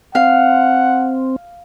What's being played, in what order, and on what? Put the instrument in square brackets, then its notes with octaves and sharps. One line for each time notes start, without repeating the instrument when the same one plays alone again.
[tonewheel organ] C4 [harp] F5 [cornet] F#5